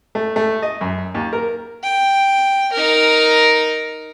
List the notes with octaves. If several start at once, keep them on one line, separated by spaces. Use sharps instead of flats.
A3
A3
D#5
F#2
D#2
A#4
G5
D#4 A#4